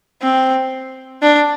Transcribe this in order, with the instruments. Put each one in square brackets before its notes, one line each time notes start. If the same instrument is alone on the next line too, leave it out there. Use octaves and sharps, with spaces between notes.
[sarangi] C4
D4